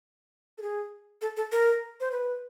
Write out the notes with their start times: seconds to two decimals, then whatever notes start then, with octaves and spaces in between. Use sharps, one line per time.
0.58 A4
0.62 G#4
1.22 A4
1.37 A4
1.52 A#4
2.00 C5
2.12 B4